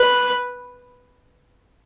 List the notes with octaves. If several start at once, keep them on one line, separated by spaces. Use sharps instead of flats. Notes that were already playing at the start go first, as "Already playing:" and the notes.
Already playing: B4